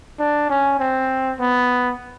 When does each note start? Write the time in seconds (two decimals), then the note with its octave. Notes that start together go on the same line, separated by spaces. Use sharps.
0.19 D4
0.50 C#4
0.80 C4
1.40 B3